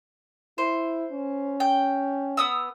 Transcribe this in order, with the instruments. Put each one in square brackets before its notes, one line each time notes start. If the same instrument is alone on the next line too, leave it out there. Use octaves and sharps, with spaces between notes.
[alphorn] E4 [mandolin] C5
[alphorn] C#4
[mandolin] G5
B3 D#6 E6